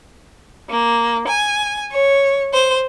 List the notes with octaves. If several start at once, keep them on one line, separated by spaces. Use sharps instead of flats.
A#3
G#5
C#5
C5